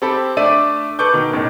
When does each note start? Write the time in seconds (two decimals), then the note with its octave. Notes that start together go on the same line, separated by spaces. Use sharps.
0.02 C4 G4 A4 G5 B5
0.37 A3 D4 D5 E5 D#7
0.99 A4 B4 C#6 D6 G6
1.14 B2 D#3
1.33 F#1 A2 D#3